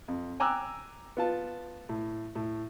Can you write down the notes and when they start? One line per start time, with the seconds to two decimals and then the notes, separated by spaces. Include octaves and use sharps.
0.08 F2
0.40 G5 G#5 A#5 D6 E6 F#6
1.17 B3 F4 A5
1.89 A2
2.35 A2